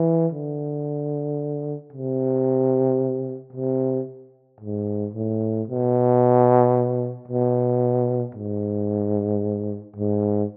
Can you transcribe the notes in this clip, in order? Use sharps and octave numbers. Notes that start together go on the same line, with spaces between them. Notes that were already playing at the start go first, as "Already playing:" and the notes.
Already playing: E3
D3
C3
C3
G#2
A2
B2
B2
G#2
G#2